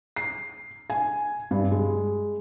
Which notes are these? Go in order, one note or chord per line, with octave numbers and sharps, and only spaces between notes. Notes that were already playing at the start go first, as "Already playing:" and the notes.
C7
G#5
G2
G#3